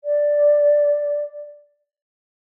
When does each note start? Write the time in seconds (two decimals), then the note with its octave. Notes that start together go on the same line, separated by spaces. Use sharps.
0.04 D5